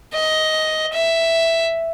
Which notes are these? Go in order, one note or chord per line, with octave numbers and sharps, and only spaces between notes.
D#5
E5